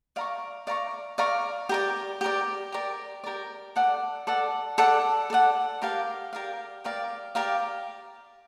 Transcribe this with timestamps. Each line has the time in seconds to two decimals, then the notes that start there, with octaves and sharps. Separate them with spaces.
0.16 D5 F5 A#5 C#6
0.67 D5 F5 A#5 C#6
1.18 D5 F5 A#5 C#6
1.69 G4 A#4 D5
2.21 G4 A#4 D5
2.72 G4 A#4 D5
3.24 G4 A#4 D5
3.76 A4 D5 F#5
4.27 A4 D5 F#5
4.78 A4 D5 F#5
5.30 A4 D5 F#5
5.82 G4 A#4 D5 F5
6.33 G4 A#4 D5 F5
6.84 G4 A#4 D5 F5
7.35 G4 A#4 D5 F5